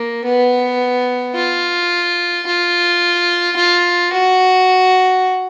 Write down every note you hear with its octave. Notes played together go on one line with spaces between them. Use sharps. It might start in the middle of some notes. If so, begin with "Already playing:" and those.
Already playing: A#3
B3
F4
F4
F4
F#4